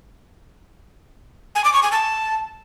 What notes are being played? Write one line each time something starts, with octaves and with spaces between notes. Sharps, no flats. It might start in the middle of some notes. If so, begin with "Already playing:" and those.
G#5
D6
C#6
G#5
A5